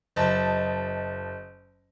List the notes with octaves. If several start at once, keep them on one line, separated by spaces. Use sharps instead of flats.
F#1 D#5 A5